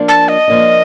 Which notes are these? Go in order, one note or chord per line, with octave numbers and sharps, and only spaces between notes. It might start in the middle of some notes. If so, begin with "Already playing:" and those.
Already playing: F3 A#3 D4
A5
D#5
F3 A#3 D4